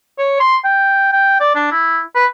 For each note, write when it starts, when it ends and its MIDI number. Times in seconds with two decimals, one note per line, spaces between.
0.18 0.39 73
0.40 0.57 84
0.65 1.09 79
1.12 1.40 79
1.40 1.54 74
1.55 1.67 62
1.71 2.00 64
2.15 2.25 71